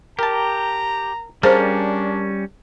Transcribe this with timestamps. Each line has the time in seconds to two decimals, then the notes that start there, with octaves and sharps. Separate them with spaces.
0.19 G4 A#4 A5 A#5
1.43 G3 C#4 D4 G#4 A#4 C5 F5 A5